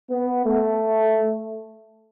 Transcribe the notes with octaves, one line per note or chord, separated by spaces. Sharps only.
B3
A3